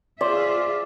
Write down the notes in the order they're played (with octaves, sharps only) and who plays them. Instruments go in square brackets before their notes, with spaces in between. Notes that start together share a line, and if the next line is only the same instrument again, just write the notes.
[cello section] F4 G#4 E5 [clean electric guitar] C5 [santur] D5